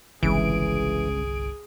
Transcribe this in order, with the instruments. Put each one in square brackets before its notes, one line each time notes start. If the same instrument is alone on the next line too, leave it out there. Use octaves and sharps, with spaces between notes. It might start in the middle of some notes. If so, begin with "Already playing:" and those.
[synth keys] G1 C2 D7 [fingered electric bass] C#3 G#3 [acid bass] E3 [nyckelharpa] G#4